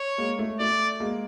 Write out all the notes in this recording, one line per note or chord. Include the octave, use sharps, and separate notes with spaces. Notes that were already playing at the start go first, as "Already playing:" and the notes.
Already playing: C#5
G#3 A#3
A3
A3 D5
G#3 A#3